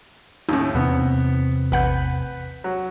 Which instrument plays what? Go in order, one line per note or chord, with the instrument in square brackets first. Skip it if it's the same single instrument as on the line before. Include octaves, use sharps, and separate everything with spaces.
[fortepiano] D#2 A2 [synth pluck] C#4 D#4
[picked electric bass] E2 C3 C4 [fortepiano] B3
[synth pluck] A1 F#5 G6 [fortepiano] B4
[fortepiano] F#3